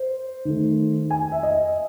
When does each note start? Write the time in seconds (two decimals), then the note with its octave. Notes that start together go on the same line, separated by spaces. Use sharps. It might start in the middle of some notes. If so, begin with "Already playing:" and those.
Already playing: C5
0.45 D#3 A3
1.11 G#5
1.32 E5
1.43 D#5